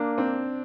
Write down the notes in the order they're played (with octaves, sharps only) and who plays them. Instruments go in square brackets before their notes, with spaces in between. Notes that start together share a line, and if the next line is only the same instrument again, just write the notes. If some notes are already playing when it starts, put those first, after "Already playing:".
Already playing: [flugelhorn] A#3 [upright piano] D4
[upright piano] C4